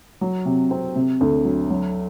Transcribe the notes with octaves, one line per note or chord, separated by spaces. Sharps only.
F#3
C3
C4
C3
D2
F#3
F#3